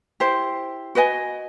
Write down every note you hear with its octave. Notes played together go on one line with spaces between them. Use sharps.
E4 G4 C5
F#4 B4 D#5 G#5